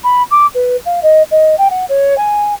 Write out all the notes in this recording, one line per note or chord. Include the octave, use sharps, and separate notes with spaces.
B5
D6
B4
F5
D#5
D#5
G5
F#5
C#5
G#5